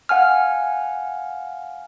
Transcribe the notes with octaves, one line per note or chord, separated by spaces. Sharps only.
F5 F#5 G#5 F6